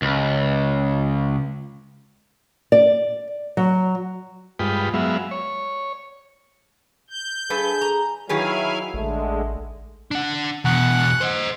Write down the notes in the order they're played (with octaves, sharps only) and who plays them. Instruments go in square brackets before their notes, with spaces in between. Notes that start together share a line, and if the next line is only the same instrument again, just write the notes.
[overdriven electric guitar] C#2
[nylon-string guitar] D5
F#3
[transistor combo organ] G2 G#3 F4 B4 G5 D#6
F#3 G#3 B3 E5 F5
C#5
[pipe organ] G6
[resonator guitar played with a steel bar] G2 A4 B4 [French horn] G#4
[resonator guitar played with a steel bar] A#5
[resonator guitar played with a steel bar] D#3 G#4 B4 [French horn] F#3 [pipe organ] E4 F5 G#5
[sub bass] A1 [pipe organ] D3 G#3 [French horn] A3
[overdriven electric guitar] D4 F#5
[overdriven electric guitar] E2 B2 [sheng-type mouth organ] F#5
[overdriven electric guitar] C5 D#5